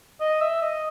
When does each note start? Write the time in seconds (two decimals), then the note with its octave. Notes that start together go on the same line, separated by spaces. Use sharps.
0.20 D#5
0.41 E5
0.62 D#5